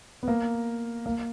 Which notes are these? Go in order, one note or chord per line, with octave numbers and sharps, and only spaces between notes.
B3
A#3
A#3